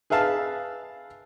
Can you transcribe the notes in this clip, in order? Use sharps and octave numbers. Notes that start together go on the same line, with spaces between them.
G#4 B4 E5 F5 A5